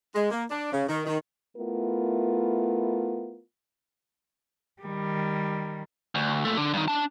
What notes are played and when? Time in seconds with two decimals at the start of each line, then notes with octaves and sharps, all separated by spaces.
0.15 G#3
0.31 A#3
0.51 D4
0.72 C#3
0.89 D#3
1.06 D#3
1.57 A3 B3 E4 F4 A#4
4.82 D#3 G3
6.15 D2
6.45 A#2 A3
6.57 D3
6.74 G2 D#3
6.88 D4 A5